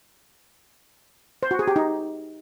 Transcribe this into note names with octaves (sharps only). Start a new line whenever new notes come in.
C5
F#4
G#4
G4
D#4